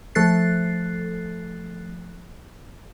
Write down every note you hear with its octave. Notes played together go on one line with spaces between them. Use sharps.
F3 A3 A4 F#6 A6 C7